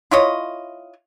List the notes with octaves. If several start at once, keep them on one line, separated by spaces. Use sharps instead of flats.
E4 F4 C#5 D#5